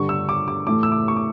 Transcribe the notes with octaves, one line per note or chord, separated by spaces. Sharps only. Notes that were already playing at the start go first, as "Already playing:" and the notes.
Already playing: G2 D3 G3 C#6
E6
D6
D6
A2 E3 A3 D6
E6
D6
C#6
D6